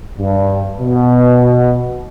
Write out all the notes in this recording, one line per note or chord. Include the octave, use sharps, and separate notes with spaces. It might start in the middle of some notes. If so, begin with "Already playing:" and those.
G2
B2